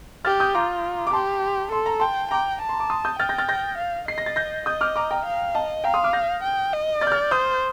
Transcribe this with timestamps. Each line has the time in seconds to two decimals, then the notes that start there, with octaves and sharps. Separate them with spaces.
0.25 G4 F6 A6
0.40 D#6 G6
0.55 F4 A#5 D6
1.07 D6
1.13 G4 A5 C6
1.72 A4 C6
1.86 A#5
2.00 G5 A5 C6
2.31 G5 A#5 D6
2.61 A5
2.69 C6
2.80 D6
2.90 C6 D#6
3.05 D#6 G6
3.19 G5 F6 A6
3.29 G6 A#6
3.38 F6 A6
3.49 G6 A#6
3.78 F5
4.08 D#5 C7
4.18 A#6
4.26 A6
4.36 G6 A#6
4.66 D#5 D#6 G6
4.81 D6 F6
4.96 A#5 D6
5.11 G5 A#5
5.25 F5
5.55 D#5 F5 A5
5.84 F5 G5 A#5
5.94 C6 D#6
6.04 D6 F6
6.13 G6 A#6
6.43 G5
6.73 D#5
7.01 D5 F6 A6
7.07 G6
7.12 F6 A6
7.31 C5 D#6 G6